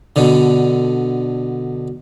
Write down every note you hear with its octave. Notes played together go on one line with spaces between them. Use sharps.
B2 D3